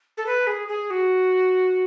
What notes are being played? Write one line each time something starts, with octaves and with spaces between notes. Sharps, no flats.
A4
B4
G#4
G#4
F#4